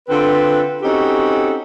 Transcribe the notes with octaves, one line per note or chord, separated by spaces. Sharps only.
D3 C4 F4 A4 B4
C4 C#4 D#4 F#4 G4 A4